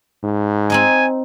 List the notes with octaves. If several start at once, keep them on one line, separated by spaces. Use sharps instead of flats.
G#2
C4 D#4 D#5 G#5